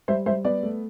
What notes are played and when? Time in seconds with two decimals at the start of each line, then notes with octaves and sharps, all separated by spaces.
0.08 G3 C5 E5
0.26 G3 C5 E5
0.45 B3 D5
0.63 A3